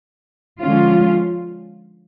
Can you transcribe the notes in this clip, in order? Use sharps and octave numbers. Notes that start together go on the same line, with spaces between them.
D3 F3 G#3 C#4 F4